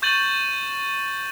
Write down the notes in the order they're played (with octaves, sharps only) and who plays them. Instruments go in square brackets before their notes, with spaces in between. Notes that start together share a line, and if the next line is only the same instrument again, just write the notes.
[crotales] C#6 G6 A6 D#7 F#7